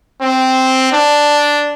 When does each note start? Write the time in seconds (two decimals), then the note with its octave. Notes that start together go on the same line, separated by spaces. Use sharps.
0.21 C4
0.92 D4